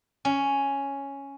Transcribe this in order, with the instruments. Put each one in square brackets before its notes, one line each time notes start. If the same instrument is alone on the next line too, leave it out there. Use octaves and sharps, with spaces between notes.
[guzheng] C#4